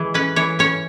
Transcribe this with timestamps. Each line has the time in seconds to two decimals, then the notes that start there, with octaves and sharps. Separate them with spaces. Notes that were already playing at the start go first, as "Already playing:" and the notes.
Already playing: E3 G#3 G#4
0.14 C#4 B4
0.36 E3 C#5
0.59 C#4 C#5